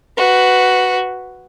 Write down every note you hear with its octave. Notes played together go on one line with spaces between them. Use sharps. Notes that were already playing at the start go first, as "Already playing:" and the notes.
F#4 B4